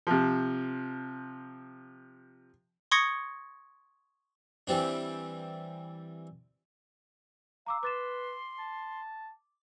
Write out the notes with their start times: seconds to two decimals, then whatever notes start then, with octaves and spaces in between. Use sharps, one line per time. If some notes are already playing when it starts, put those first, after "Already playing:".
0.07 C3 F3
2.91 C6 C#6 D#6 G#6 A#6 C#7
4.67 E3 G3 C4 D4
7.66 F5 A#5 D6 E6
7.83 B4 C6 D6 A6 E7
8.58 A5